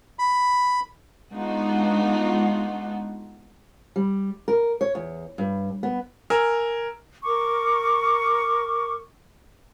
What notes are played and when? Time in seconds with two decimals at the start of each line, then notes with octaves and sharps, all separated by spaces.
0.19 B5
1.32 G#3 B3 D4 D#4 F4 F#4
3.96 G3
4.48 A#4
4.81 C#5
4.95 E2
5.38 G2
5.83 B3
6.30 A#4 G#5 A#5 E6 F6
7.24 A#4 C#6 D6